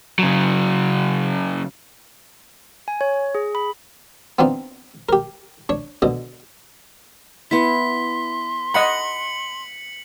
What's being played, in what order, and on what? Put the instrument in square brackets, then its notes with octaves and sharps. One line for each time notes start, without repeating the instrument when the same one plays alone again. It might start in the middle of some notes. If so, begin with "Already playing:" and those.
[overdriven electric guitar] C#3 F#3
[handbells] G#5
C#5
G#4
B5
[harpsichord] B3 C4 D4 D#4 F4
G4 A#4
D4 C#5
B2 D3 D#5
[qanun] B3 E4 [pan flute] C6 [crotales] B6
[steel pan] D#5 F#5 B5 [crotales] C#7 F#7